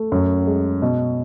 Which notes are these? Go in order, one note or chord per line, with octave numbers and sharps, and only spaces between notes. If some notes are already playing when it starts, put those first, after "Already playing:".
Already playing: A3
F#2
G#3
B2